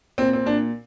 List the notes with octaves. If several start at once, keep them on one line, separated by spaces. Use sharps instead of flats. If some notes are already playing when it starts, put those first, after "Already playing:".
A#2 C4
C4
A#2 D4